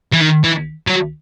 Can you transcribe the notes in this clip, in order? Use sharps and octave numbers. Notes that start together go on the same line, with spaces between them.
E3
D#3
E3
F#3